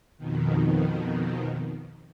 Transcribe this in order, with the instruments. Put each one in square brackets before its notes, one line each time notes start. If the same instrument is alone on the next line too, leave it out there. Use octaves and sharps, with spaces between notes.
[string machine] F2 B2 D#3